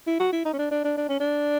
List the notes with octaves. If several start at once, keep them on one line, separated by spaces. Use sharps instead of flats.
E4
F#4
E4
D#4
C#4
D4
D4
D4
D4
C#4
D4